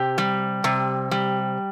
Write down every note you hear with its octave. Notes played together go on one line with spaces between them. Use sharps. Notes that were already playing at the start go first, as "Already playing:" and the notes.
Already playing: C3 G4
G3
C3
G3